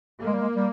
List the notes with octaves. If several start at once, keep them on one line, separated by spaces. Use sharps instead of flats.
A#3
G#3
G3
G#3
G3